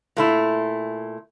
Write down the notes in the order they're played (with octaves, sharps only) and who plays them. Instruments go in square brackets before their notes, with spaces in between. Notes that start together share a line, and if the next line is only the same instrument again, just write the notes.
[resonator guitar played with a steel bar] A#2 A3 E4